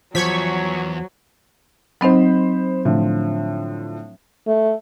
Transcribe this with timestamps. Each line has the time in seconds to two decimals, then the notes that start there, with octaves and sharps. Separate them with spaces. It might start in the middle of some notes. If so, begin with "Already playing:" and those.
0.15 E2 F3 F#3 C#6 G#6 B6
2.01 F#3 C4 D#4 C5 D#5 B5
2.85 A2 D3 F3
4.47 A3